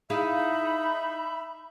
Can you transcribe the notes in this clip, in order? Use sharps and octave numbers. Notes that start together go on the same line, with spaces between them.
D#4 E4 G#4 E5 F5 B5